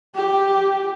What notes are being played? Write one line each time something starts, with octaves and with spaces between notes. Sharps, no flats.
G4